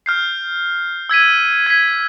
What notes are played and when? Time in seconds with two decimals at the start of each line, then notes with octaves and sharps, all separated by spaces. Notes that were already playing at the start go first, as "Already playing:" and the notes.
0.06 F6 G6 C7
1.09 E6 G#6 B6 D#7
1.66 G#6 B6